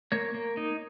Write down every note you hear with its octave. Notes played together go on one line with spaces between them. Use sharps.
A#3 C#5
A#3
D#4